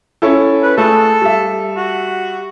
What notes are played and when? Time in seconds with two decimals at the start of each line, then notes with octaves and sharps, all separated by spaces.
0.22 C#4 E4 A4
0.63 B4
0.78 A3 G#4 A4
1.22 G3 E5
1.77 F#4